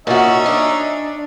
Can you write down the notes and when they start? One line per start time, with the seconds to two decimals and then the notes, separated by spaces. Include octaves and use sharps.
0.07 A#2 C#4 D#4 F#4 E5
0.46 D4